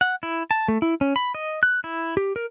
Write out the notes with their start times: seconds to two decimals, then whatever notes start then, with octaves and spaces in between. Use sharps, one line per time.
0.01 F#5
0.23 E4
0.51 A5
0.68 A3
0.82 E4
1.01 C#4
1.16 B5
1.35 D#5
1.63 F#6
1.84 E4
2.17 G4
2.36 A#4